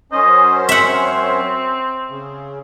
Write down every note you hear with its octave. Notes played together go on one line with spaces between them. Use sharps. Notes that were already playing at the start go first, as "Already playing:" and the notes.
F#2 C#4 C5 D#5
C4 E5 F#5
C#3